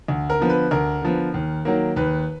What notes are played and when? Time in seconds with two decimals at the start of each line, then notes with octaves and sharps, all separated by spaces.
0.08 D2
0.30 A#4
0.39 D3 F3 B3
0.50 B4
0.71 D2 A#4
1.02 D3 F3 B3
1.34 D#2
1.65 D#3 F#3 A#3
1.96 D#2 B4